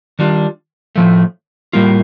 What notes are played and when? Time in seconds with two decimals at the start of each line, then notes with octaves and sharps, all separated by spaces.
0.19 D#3 G3 D4 F4
0.96 A2 F3 A3
1.73 A2 G3 A#3 F4